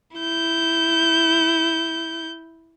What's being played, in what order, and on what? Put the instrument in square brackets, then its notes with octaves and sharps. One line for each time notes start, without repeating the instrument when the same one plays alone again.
[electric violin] E4 G6